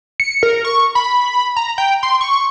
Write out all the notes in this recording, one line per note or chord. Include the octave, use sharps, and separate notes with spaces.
C#7
A#4
C#6
B5
A#5
G5
C6
C#6